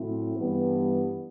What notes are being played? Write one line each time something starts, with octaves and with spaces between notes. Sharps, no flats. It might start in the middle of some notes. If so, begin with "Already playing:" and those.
Already playing: A2 F#3 C4 E4
G2 E3 G3 B3